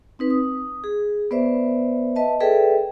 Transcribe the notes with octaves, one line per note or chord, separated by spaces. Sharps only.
C4 D#4 B4
D#6
G#4
B3 B4 C5 D5 E5
B4 D#5 E5 A5
G#4 A4 B4 D5 E5 G5